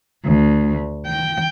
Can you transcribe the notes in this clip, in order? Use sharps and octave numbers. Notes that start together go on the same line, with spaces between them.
D2
G5